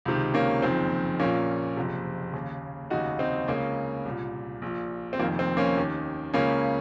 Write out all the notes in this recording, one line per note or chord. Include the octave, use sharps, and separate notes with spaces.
C#2 C3 D#3
A#3 C#4
F#1 F2 D#3 C4
A#1 A#2 A#3 C#4
F#1 F2 C3
D#2 C#3
F1 D#2 C#3 D#4 F#4
C4 D#4
C#2 C#3 A#3 C#4
C2 A#2
A#1 A#2
C4
F1 F2 D#3 A#3
C4
A#3 C#4
D#2 D#3
C#2 C#3 A#3 C#4